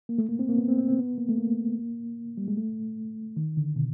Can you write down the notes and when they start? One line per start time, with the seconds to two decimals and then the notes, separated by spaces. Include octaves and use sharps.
0.09 A#3
0.18 A3
0.29 A#3
0.39 C4
0.49 A#3
0.58 B3
0.68 C4
0.78 C4
0.89 C4
0.99 B3
1.18 A#3
1.29 A3
1.38 A#3
2.37 G3
2.48 G#3
2.57 A3
3.37 D#3
3.57 D3
3.76 B2